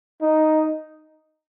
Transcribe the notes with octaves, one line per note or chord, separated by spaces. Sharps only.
D#4